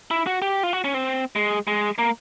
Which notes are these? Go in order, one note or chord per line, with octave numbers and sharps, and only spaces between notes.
E4
F#4
G4
F4
F#4
C#4
C4
G#3
G#3
A#3